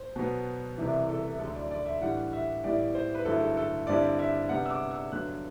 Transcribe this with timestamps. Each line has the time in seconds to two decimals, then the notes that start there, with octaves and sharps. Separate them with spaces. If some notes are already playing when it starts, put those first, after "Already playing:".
Already playing: C5
0.16 B2 F#3 B3
0.77 C2 C3 E3
1.09 A4
1.39 D2 D3 F#3 A4
1.55 D5
1.71 D5
1.86 E5
2.01 A2 E3 G3 D4 F#5
2.33 E5
2.64 A2 G3 B3 E4 D5
2.95 C5
3.15 B4
3.25 G2 D3 F#3 A3 E4 A4
3.40 A4
3.57 A4
3.87 G2 D3 G3 C4 E4 D5
4.19 E5
4.49 C3 G3 B3 D4 F#5
4.66 E6
4.71 D6
4.91 E6
5.12 G2 D3 F#3 B3 F#6